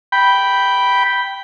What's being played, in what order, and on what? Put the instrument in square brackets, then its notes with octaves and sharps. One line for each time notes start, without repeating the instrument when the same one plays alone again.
[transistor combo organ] G5 B5